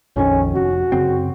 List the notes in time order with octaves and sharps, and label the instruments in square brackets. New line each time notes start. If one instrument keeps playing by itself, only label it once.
[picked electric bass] A#1 F2 D#3 [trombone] C#4
[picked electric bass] F1 [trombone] F#4
[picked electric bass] F#2 C#3 C4